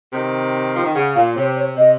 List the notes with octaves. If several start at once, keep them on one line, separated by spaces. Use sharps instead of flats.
C3 D#3
F3
D#3
C#3 F#5
A#2 F5
C3 C#5
C#5
C3 D#5